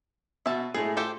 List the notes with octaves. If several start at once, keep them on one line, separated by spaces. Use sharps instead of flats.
B2 F#4 E5 A5
A2 G#3 A3 G#4
F4 G4 A4 C5